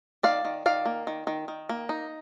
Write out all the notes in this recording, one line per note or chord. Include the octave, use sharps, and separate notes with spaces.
D#3 D5 F5
D#3
D#3 D5 F5
A#3
D#3
D#3
D#3
A#3
D#4